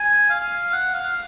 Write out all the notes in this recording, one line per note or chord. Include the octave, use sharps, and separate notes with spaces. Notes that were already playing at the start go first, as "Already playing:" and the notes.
Already playing: G#5
F5
F#5
F5